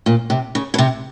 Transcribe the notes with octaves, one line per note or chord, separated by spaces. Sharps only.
A#2
C3
C#3
B2
C3